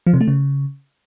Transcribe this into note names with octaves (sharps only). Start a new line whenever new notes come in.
F3
C3
A3
C#3